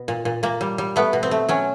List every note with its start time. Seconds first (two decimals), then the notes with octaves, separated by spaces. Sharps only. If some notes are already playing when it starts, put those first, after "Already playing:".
Already playing: B2
0.08 A#2
0.25 A#2
0.43 A#2 A#3
0.61 G3
0.78 G3
0.96 A3 B3
1.13 B2
1.23 C4
1.31 A3
1.49 F#3 C#4